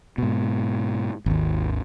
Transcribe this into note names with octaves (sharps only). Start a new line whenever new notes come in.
G#2 B2
G#1 D#2